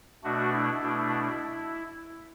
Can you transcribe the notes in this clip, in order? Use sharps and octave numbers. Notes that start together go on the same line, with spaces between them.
B2 A3 D4 F#4
E4
B2 A3 D4